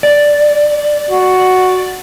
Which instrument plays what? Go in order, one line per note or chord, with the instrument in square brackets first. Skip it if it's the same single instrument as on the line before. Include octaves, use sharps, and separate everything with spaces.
[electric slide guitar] D5
[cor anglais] F#4